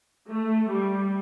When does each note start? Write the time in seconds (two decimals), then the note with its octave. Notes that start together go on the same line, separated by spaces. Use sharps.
0.30 A3
0.72 G3